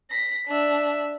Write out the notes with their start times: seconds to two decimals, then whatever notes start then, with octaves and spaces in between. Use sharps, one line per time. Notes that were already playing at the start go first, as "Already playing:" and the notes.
0.11 A#6 B6
0.48 D4 E5